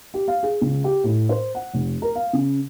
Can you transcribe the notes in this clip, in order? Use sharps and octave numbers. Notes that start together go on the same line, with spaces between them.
G4
F5
G#4
C#2
G4
A2
C5
F#5
F1
A#4
F5
C#3